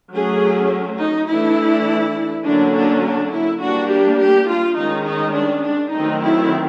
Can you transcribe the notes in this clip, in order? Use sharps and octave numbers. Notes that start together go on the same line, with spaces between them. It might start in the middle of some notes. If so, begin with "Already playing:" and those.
F#3 A3 C#4 G#4
D#4
E3 A3 D4 E4
D3 F#3 A#3 C#4 D4
D4
D4
E4
G3 A#3 D4 F#4
G4
G4
F4
D#3 G#3 C#4 D#4
D#4
D4
D4
D#3 F#3 A3 C4 D#4
E4